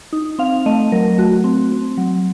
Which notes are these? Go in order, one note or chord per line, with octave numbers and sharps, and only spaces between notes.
D#4
C4 F5
A3 D#5
F#3 A#4
A3 F#4
C4
C4
F#3